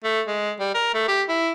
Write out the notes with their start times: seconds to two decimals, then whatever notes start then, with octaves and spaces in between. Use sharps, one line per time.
0.04 A3
0.28 G#3
0.60 G3
0.74 A#4
0.94 A3
1.08 G4
1.29 E4